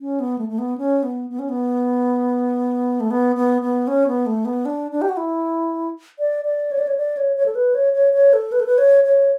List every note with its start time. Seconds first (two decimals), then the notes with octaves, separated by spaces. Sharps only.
0.01 C#4
0.20 B3
0.38 A3
0.49 A3
0.58 B3
0.78 C#4
1.03 B3
1.30 B3
1.39 C#4
1.49 B3
3.00 A3
3.10 B3
3.36 B3
3.62 B3
3.87 C#4
4.07 B3
4.26 A3
4.45 B3
4.65 D4
4.91 D4
5.02 G4
5.09 F#4
5.17 E4
6.19 D5
6.45 D5
6.71 C#5
6.79 D5
6.87 C#5
6.97 D5
7.17 C#5
7.36 C#5
7.46 A4
7.55 B4
7.75 C#5
7.93 C#5
8.13 C#5
8.33 A4
8.52 B4
8.60 A4
8.67 B4
8.78 C#5
9.04 C#5